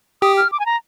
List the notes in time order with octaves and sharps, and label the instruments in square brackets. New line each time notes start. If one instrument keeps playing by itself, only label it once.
[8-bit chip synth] G4 [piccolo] D#6
[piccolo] F6
D6
G#5
A#5